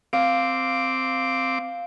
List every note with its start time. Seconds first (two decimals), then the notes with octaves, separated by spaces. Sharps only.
0.13 C4 F5 D6